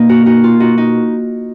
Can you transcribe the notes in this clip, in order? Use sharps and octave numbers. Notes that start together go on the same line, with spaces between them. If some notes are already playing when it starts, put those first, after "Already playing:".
Already playing: B2 A#3 D#4
F#4 A#4
D#4 F#4
F4
D#4 F#4
D#4